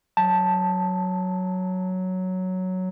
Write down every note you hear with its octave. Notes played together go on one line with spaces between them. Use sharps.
F#3 A5